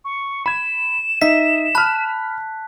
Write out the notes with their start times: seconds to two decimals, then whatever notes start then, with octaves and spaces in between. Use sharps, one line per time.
0.05 C#6
0.46 B5 G#6 E7
1.22 D#4 D#5 E5 B6
1.75 A5 B5 F6 F#6